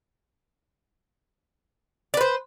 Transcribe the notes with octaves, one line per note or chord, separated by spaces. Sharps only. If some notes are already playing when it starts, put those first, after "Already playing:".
B4 C5 D5